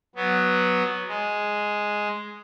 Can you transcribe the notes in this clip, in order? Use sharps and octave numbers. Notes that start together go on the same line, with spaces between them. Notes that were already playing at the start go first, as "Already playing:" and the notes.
F#3 B3
G#3